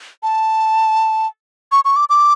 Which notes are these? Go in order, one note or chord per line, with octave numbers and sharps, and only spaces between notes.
A5
C#6
C#6
D6
D6